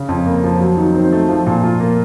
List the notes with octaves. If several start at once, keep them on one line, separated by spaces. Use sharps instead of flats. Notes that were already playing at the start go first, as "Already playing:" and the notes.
Already playing: C#3
F2
A#3
F3
F#3
D#3
C4
A3
F3
A#2
F4
A#3